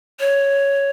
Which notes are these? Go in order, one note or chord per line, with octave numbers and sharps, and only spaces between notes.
C#5